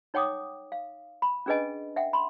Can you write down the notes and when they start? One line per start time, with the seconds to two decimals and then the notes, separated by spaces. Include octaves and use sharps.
0.14 D#4 C#5 F#5 G5 D6 D#6
0.72 F5
1.22 B5
1.46 C#4 D4 G#4 B4 D#5 G#5
1.96 E5 F#5 G5
2.13 B5 C6